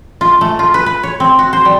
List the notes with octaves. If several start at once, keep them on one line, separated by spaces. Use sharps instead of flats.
F4
A3
F4
B4
B4
C#5
C4
F#4
C5
G3